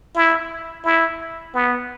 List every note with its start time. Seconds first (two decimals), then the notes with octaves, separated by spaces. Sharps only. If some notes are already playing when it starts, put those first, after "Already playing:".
0.15 E4
0.85 E4
1.54 B3